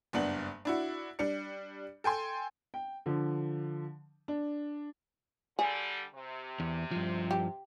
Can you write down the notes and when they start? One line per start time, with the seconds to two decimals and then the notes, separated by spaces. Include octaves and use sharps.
0.13 F#1 G2 B3 D4 F#7
0.65 D4 E4 F#4
1.19 G3 D4 C#7
2.04 A4 G5 G#5 C6
2.74 G5
3.06 D3 F3
4.28 D4
5.59 D3 G3 G#4
6.14 C3
6.60 E2
6.91 G2 F3
7.31 G4